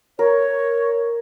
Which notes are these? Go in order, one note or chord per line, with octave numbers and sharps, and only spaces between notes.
A#4 C#5